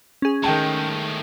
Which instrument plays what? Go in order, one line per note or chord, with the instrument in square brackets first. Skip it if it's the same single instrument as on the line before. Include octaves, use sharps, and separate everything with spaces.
[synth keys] C#4 G#4
[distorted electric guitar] A2 G#3 [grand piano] D#3 G5 A5